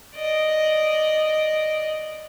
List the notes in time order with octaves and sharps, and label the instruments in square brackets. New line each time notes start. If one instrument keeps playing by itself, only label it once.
[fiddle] D5 D#5